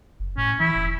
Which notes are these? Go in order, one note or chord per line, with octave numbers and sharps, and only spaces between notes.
F#1
A2 C#4
E3 E4
E1